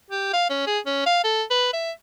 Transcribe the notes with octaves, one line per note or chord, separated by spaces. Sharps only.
G4
F5
C#4
G#4
C#4
F5
A4
B4
E5